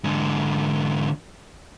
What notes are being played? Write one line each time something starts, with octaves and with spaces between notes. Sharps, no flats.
G#2 D3